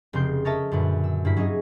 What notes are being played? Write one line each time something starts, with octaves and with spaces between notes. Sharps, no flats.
F1 C#3 C4 C6 G6
A4 A#4 C#5 D#5 E5 A5
F#2 A#2 D3 B4
E6
G2 A#3 E4 B6
F#3 C#4 D#4 G#4 D#5